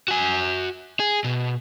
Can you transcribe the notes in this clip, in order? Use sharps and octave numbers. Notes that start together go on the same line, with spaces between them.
F#4 G#5
G#4
B2